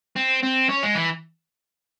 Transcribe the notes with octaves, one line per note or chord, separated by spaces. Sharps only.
C4
C4
C#4
G#3
E3